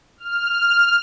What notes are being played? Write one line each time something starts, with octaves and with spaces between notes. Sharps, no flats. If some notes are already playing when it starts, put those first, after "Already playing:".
F6